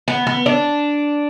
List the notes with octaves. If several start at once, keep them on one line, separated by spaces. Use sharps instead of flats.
B3
B3
D4